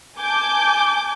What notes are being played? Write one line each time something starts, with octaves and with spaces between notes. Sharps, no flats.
G#5 A5 D6 G6